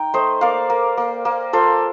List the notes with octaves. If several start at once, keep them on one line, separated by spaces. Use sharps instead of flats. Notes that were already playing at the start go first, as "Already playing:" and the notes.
Already playing: D#4 G5
A3 C5 D#5
A#3 D5 F5
A#3
A#3
A#3
F4 A4 C5